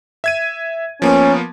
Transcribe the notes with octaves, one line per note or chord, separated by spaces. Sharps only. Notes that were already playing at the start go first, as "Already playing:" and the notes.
E5 G#6 D#7
F3 A#3 B3 C#4